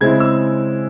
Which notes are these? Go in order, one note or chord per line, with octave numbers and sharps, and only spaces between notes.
C#3 G#3 C4 E4 G#6
E6